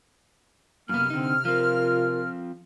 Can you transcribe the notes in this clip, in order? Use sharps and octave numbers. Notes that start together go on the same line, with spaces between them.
F#2 C3 A#3 B3 F6
D3 C4 D#4
F3 C4 F4 A#4